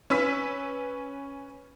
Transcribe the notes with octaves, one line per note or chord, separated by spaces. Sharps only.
C#4 B4 E6 B6